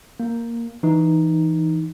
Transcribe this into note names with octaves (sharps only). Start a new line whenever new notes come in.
A#3
E3 D#4